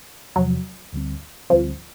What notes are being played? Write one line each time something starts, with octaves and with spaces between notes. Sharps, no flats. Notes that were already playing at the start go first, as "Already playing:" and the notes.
E2 C3 F3 F#3
D2 D3 G3 C4
D2 D3 F3 G3 C4